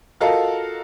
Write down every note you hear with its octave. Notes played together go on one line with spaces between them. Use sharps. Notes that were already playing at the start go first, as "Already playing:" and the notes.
F4 F#4 A4 A#4 D#5 F5